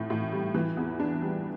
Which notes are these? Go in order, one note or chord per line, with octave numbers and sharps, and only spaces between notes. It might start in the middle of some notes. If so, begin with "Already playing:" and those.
Already playing: A2 E3
A2
G3
E3
E2
D4
G3